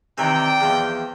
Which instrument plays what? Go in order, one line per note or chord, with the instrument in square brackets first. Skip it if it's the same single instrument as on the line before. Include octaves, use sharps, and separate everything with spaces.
[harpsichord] C3 D#3 E3 [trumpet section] D5 G5
[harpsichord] E2 F3